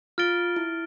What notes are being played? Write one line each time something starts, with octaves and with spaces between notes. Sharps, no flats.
F4 F6 A6 D7 G7
E4